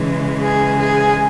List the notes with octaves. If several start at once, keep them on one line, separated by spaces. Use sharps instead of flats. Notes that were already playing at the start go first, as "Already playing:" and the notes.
Already playing: C#3 E3 G#3
G#4
G#4